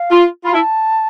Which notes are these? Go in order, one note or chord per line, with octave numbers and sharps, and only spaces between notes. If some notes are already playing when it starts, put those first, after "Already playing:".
Already playing: F5
F4
F4 B5
E4 A5